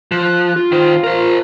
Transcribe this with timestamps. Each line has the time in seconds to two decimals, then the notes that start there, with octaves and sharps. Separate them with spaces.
0.11 F3 F#6
0.56 F4
0.72 D#3 C5
1.04 A#4 C5